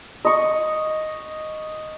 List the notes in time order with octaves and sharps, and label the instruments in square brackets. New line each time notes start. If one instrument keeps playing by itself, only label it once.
[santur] D#5 C#6